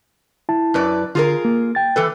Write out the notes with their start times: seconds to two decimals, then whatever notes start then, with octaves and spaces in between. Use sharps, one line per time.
0.49 E4 A5
0.74 F#2 B4 D5
1.15 D3 F4 G#4 A#4
1.45 A#3
1.75 G5 A6
1.96 E3 A4 B4